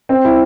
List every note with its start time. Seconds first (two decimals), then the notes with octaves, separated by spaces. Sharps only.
0.09 C4
0.25 E4